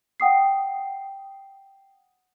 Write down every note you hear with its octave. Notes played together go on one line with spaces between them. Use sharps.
F#5 G5 D#6 C7